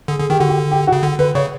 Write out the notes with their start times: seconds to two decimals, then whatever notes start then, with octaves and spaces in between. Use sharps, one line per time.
0.08 D3 G#4
0.19 D3 G#4
0.30 D#3 G4
0.39 D3 F#4
0.49 G4
0.71 G4
0.87 F#4
0.92 C#3
1.03 D3
1.19 D3 B4
1.35 C#3 C#5